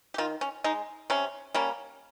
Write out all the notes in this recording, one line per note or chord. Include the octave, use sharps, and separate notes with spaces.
G4
D#3 F4
C#4
G#3 D#4
C3 C#4
G3 A#3 C#4